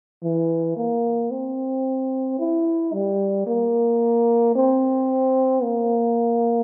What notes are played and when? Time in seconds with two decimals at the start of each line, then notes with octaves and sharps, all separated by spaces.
0.23 E3
0.77 A#3
1.31 C4
2.39 E4
2.93 G3
3.47 A#3
4.56 C4
5.63 A#3